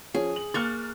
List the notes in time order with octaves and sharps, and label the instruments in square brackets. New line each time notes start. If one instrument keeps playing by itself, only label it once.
[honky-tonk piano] F3 C#4 [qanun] G#4
[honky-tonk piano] F#7
[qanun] A#3 C#6 [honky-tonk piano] F6 F#6 A6